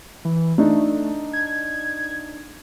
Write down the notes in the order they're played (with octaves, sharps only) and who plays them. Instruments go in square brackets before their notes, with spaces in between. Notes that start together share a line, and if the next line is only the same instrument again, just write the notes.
[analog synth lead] E3
[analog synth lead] A3 [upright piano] D4 D#4
[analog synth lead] G#6